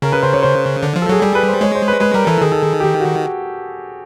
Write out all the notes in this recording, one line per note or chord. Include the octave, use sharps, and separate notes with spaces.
C#3 A#4
B4
C5
C#5
C5
D3
F3
A4
F#3 G#4
G3 G#4
B4
C5
G#3 C#5
C5
B4
G#3 B4
G3 A#4
E3 A4
D#3 G#4
A4
G#4
G4
F#4